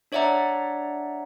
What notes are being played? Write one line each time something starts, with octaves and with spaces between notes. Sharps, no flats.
D4 C#5 D5 E5 F#5 A#5